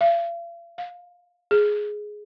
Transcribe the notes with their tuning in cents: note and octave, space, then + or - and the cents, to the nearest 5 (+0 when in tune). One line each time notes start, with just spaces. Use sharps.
F5 -45
F5 +20
G#4 +10